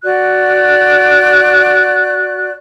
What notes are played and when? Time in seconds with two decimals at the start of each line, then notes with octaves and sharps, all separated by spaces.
0.03 F#4 D5 F#6